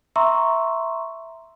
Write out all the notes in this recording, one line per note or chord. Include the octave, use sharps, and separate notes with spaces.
E5 A#5 C6 C#6 E6